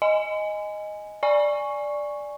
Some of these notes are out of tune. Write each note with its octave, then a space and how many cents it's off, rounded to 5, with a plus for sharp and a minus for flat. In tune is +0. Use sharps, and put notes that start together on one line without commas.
D#5 +0 G#5 +0
D5 +0 G#5 +0 C#6 +0